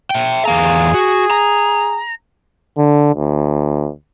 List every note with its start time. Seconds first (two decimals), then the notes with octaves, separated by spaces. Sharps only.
0.10 E5 G5
0.45 E2 G#4 F5 A#5
0.94 F#4
1.31 A#5
2.78 D3
3.15 D2